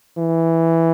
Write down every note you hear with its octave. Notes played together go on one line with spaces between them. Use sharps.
E3